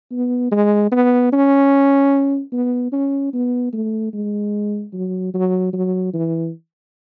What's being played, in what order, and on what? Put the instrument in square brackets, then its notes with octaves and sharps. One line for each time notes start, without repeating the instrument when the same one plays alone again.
[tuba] B3
G#3
B3
C#4
B3
C#4
B3
A3
G#3
F#3
F#3
F#3
E3